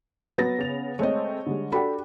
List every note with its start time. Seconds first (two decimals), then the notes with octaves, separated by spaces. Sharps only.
0.38 F#3 B3 A6 A#6
0.58 C#3 F7
0.99 G#3 A3 C4 C#5 D#5
1.46 D3 G3 G#3
1.72 D4 F#4 G4 A4 B5